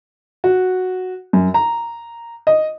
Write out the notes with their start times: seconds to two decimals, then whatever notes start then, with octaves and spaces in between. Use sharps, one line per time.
0.44 F#4
1.33 F#2
1.54 A#5
2.47 D#5